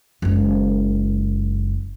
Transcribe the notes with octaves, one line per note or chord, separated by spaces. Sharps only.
F#1 G#3